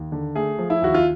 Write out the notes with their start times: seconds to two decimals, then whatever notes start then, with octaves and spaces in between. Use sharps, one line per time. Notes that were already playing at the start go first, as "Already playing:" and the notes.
Already playing: D#2
0.12 D3
0.35 A3 G#4
0.59 F3
0.70 E4
0.82 D#2 F#4
0.94 F4